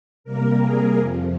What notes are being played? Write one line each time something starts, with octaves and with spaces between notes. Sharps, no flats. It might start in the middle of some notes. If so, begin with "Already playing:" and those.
C3 G3 A#3 A#4
G#4
F2 C3 F3